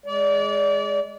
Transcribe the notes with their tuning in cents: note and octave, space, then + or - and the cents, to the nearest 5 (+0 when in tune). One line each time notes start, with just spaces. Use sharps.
G#3 +0 D5 -30